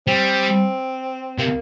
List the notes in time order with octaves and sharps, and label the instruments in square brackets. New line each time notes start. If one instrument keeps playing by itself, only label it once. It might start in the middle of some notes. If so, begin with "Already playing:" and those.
[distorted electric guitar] G3 [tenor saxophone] C4
[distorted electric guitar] C3 [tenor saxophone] A#3